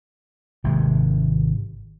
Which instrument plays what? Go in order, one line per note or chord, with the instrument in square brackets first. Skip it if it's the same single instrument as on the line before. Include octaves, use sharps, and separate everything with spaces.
[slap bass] G#1 C3 G#3